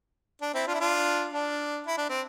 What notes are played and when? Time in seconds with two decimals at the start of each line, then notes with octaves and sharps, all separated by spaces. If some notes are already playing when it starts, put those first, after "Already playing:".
0.41 D4
0.54 C4 E4
0.67 D4 F4
0.75 E4
0.80 D4 F4
1.33 D4
1.86 E4
1.97 D4
2.09 C4